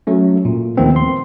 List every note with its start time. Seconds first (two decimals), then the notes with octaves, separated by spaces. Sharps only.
0.07 F#3 A3 C#4
0.45 A#2
0.77 D#2 D#3 F3 A3 B3 C4
0.96 C6